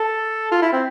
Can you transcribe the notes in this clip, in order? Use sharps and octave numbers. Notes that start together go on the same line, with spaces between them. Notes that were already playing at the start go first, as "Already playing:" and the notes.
Already playing: A4
F4
E4
C4